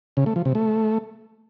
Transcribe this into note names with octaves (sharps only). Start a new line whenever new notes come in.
C#3
A3
F3
C3
A3